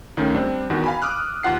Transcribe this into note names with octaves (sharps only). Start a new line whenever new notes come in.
C#2 D#3 A3 C#4
G3 C4 D4
E2 D#3 F#4
F5 G#5 B5
D6 D#6 F6 F#6
D#2 F4 F#5 C7